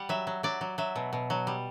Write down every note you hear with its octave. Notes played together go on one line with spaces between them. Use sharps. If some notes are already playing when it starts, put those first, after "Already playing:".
Already playing: G3 F#5
F#3 E5
F#3
F#3 D5
F#3
F#3 E5
B2
B2
F#3
G3